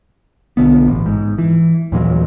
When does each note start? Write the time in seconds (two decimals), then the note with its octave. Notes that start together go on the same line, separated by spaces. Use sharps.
0.57 B1 D3 B3
0.88 A1
1.06 G#2
1.38 E3
1.92 D#2 A#2 E3 F#3